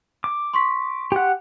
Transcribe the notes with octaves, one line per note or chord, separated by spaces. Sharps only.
D6
C6 C#6 B6
G4 F#5